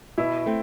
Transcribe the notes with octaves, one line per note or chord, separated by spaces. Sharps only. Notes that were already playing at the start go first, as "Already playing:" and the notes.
B2 E4
A3 C4